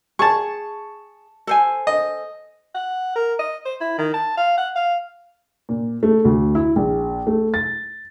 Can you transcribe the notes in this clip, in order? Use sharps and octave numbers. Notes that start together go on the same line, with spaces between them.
G#4 A5 C#6
A4 C5 G#5
D#5
F#5
A#4
D#5
C5
E4
D#3
A5
F5
F#5
F5
A#2
A3
D2
E4
A#1
A3
A6